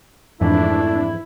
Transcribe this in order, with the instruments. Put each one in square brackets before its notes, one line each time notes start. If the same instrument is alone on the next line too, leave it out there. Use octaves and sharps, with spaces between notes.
[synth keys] F2 G#2 E3 [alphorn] A3 [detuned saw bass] D4 [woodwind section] E4